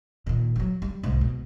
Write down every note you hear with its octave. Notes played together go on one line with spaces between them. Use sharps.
A#2 D#3
F#3 G3
G3
C2 G#2
B2